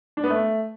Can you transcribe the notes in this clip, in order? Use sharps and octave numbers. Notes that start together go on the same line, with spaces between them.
D4
B3
A3